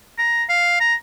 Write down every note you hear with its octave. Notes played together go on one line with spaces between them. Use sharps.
A#5
F5
A#5